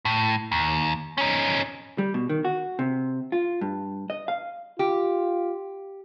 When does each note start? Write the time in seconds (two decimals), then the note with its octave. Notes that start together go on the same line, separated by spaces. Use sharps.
0.05 A2
0.52 D#2
1.18 C#4 D#4
1.98 G3
2.14 B2
2.29 D#3
2.45 F#4
2.79 C3
3.32 F4
3.61 G2
4.10 D#5
4.28 F5
4.79 F4 G4